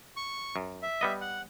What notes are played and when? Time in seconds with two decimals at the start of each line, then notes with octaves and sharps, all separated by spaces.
0.17 C#6
0.56 F#2
0.82 E5
1.01 G3 B3 D#5
1.21 F#5